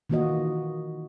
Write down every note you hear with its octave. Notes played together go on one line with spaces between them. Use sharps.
D#3 E3 A#3 F4 F#4 D#5